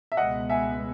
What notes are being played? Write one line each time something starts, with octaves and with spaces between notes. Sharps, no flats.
E5
C#2 B2 G#3 B3 D#5 F#5
E5 G#5